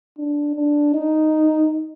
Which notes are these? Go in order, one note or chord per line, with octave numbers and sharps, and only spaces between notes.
D4
D4
D#4